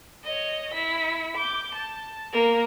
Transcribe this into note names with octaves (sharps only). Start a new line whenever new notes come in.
C#5 D#5
E4 B6
D6 G6
A5
A#3 A#4